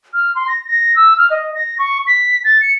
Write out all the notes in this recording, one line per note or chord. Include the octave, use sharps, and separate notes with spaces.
F6
C6
A#6
A#6
E6
F6
D#5
A#6
C#6
B6
A6
C#7